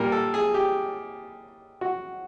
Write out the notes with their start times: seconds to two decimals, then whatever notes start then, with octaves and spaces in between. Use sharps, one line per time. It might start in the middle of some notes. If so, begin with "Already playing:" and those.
Already playing: A#2 G3 A#4
0.12 A4
0.34 G#4
0.54 G4
1.81 F#4